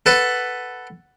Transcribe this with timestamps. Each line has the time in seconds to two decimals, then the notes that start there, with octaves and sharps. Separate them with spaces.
0.06 A4 B4 F#5